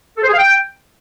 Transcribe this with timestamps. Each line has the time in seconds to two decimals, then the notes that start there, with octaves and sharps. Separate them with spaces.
0.17 A4
0.22 C5
0.28 G#4
0.33 F5
0.38 G5